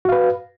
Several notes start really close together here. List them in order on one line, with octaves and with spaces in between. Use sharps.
F#4 F5 B4